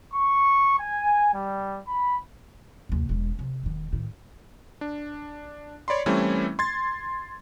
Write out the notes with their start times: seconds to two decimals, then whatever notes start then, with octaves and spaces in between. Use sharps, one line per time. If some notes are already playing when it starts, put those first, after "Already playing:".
0.12 C#6
0.77 G#5
1.32 G3
1.86 B5
2.89 D#2 C3
3.09 E1 G#3
3.39 C3
3.63 E1 D#3
3.93 A2 D#3
4.81 D4
5.88 C#5 D5 B5 C6
6.06 E3 G3 A3 C4 C#4 E4
6.59 C6 G#6 A6